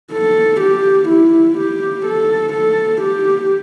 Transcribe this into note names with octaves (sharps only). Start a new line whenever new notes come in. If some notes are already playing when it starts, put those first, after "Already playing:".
A4
G4
E4
G4
A4
A4
G4